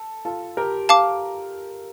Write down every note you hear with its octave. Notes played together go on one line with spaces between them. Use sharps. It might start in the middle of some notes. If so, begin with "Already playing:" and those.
Already playing: A4
F4 A4
G4 A#4
F5 A5 D6